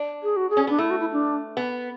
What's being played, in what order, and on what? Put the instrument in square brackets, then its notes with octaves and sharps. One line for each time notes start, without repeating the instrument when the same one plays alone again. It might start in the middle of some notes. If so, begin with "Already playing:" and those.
Already playing: [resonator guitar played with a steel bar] D4
[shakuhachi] G#4
F#4
G#4
[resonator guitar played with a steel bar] C#4
[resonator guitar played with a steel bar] B3 [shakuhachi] D4
[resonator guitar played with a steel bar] A3 [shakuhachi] E4
[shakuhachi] F#4
E4
D4
[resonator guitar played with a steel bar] B3